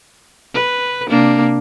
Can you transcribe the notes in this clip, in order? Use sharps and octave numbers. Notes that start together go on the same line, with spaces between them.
B4
C3 A#3 D4